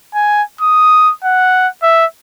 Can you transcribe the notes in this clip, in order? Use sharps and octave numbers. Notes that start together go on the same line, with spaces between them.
G#5
D#6
F#5
E5